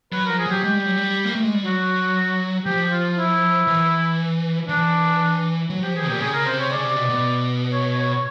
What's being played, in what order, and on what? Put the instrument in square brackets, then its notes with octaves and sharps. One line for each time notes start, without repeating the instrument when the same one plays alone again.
[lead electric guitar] F#3 [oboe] B4
[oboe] A#4
[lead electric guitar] F3
[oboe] G#4
[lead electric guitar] F#3 [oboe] G4
[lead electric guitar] G#3 [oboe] G4
[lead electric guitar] G3
F#3
G3
A#3
A3
G#3
G3
[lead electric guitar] F#3 [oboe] F#4
[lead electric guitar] F3 [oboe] G4
[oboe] F4
E4
[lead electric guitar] E3
[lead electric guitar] E3 [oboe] D4
[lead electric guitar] F#3
[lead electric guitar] F3 [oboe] G4
[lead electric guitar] E3 [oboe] G#4
[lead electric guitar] A#2 [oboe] G4
[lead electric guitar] C#3 [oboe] G#4
[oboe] A#4
[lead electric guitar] C3 [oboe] C5
[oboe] C#5
[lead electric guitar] C#3 [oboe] D5
[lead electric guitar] C3
B2
B2
[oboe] C#5
C#5
C#5